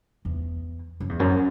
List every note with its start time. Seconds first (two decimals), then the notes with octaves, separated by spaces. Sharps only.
0.25 E2
1.00 F#2
1.09 E2
1.19 F#2